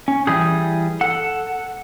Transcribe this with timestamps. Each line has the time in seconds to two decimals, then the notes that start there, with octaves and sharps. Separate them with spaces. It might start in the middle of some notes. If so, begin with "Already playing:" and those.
0.08 C#4
0.27 E3 G3 G#4 D#6
1.01 A4 F#5